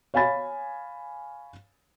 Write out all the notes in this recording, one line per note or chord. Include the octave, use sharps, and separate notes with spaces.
C#5 F5 G#5 B5 A6